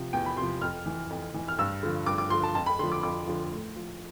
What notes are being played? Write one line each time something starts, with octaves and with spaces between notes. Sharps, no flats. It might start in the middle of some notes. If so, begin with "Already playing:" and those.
Already playing: C3 F3
E2 G5
B5
C3 F3 C6
F2 F6
E3
F2
E3
F6
G2 E6
D3 F3
G2 D6
D6
D3 F3 C6
A5
F2 A5
B5
D3 F3 C6
D6
F2 D6
D3 F3
A2
F3